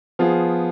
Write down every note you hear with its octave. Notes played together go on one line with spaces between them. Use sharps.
F3 B3 F4 G#4